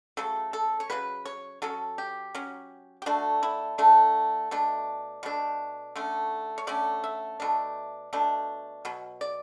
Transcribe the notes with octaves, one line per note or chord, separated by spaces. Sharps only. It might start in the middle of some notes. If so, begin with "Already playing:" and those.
C#3 F#3 A3 A4
A4
C#5
C#3 F#3 B4
C#5
F#3 C#4 A4
G4
F#3 C#4
G4
D3 A3 D4 F#4
E4
D3 A3 D4
B2 A3 D4
B2 A3 D4
D3 A3 C#4
C#5
D3 A3 C#4 D5
E5
B2 A3 D4
B2 A3 D4
B2 F#3
D5